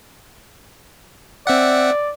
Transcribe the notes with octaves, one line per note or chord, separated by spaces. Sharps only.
C4 D5 E5 F#5